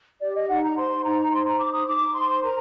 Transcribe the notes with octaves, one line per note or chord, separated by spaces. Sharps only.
G4 D5
D#5
D#4 F#5
A#5
C5 C6
D#4 A#5
C5 C6
A#5
D#4 D6
D#6
D#4 D6
C5 C6
A#4 A#5